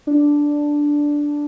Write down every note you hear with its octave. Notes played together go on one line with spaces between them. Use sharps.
D4